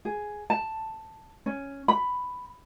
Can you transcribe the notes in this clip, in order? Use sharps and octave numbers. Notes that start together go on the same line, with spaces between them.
G#4
A5
C#4
B5